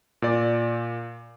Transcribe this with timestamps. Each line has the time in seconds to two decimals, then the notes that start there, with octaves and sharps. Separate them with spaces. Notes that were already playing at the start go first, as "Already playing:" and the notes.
0.22 A#2 D5